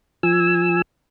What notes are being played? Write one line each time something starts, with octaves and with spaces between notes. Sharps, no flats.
F3 G#5 E6